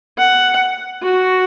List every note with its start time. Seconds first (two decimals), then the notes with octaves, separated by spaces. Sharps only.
0.19 F#5
1.03 F#4